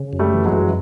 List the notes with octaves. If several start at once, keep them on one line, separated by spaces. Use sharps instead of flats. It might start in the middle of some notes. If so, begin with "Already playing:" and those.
Already playing: C#3
F#2
G3 A3
E3
F#3 G#3
F#2